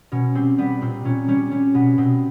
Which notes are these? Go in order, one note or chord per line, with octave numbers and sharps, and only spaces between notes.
B2 C#4
G3 C4
G3 B3
A#2 C4
A#2 C#4
G3 C#4
G3 C#4
B2 B3
B2 C4